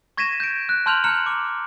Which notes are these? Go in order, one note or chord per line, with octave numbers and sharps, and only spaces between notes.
C#6 G#6 A#6 B6 D#7 E7
G6 D7
F#6
A5 C6 F6 G6 F7 F#7
A#5 F6 F#6 C#7 F#7
D6